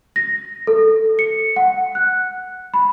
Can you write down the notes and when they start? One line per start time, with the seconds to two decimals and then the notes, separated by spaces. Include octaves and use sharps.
0.16 A#6
0.67 A4
1.19 C#7
1.56 F#5
1.95 F#6
2.74 B5